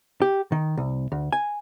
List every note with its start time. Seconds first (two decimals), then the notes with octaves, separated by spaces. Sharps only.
0.22 G4
0.52 D#3
0.77 C2
1.12 D2
1.32 G#5